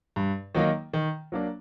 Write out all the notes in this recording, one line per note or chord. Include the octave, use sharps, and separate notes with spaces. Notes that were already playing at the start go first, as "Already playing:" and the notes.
G2
D#3 F#3 A#3 D#4
D#3
F#3 A#3 D4